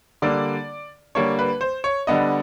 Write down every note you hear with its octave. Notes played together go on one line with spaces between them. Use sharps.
D3 G3 A#3 D4 D5
D3 G3 A#3 D4 C#5
B4
C5
C#5
D3 G3 B3 D4 D#5